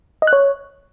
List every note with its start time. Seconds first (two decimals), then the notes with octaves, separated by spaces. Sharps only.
0.22 D#5
0.27 F#6
0.33 C#5